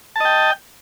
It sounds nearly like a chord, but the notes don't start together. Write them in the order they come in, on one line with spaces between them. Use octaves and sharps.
A5 D#5 G5